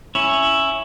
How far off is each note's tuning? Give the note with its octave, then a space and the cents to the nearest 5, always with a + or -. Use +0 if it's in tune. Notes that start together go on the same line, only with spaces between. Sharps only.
C#4 +0 E4 +5 C#5 -5